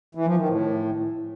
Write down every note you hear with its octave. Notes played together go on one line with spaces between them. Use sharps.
E3
F3
D#3
A2